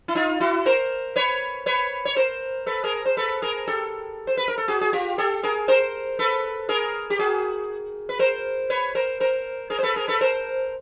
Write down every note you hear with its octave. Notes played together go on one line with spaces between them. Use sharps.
E4
D#4 F4
E4 F#4
A#4 C5
B4 C#5
B4 C#5
C#5
A#4 C5
A4 B4
G#4 A#4
C5
A4 B4
G#4 A#4
G4 A4
C5
B4
A#4
A4
F#4 G#4
G#4
F4 G4
G4 A4
G#4 A#4
A#4 C5
A4 B4
G#4 A#4
G4
F#4 G#4
B4
A#4 C5
B4 C#5
A#4 C5
A#4 C5
G#4 A#4
C5
A4 B4
G#4 A#4
A4 B4
A#4 C5